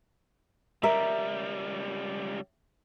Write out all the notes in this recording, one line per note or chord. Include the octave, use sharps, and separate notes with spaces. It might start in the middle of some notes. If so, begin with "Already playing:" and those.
C#2 G3 A#4 E5